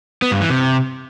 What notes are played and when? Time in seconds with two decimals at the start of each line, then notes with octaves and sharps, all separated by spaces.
0.22 B3
0.31 G2
0.41 E3
0.50 C3